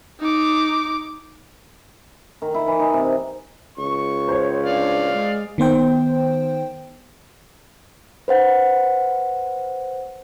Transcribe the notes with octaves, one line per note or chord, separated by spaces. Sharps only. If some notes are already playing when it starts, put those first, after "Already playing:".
D#4 D6
D#3
E4
E3
D#4
C3
C#2 C#6
C5 C#5
D4 D5 F5
G#3
D#3 B3 C5 G5
B4 C5 F#5